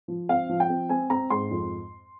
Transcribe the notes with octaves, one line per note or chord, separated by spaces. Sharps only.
F3
C4 F5
F3
G5
C4
C4 G#5
C4 A#5
G#2 C6
F2